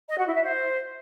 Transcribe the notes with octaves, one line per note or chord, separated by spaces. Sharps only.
D#5
F#4
E4
E5
C5